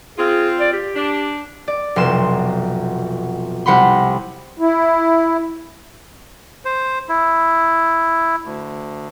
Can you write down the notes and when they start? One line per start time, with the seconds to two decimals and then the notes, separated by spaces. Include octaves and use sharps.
0.18 C4 F4 G#4
0.60 D5
0.73 G4
0.95 D4
1.68 D5
1.96 F1 B1 C6 E7
3.66 C2 F#5 B5 C6
4.60 E4
6.65 C5
7.09 E4
8.45 D2